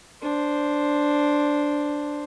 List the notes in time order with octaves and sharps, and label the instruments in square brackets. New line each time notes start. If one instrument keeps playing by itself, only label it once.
[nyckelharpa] D4 C5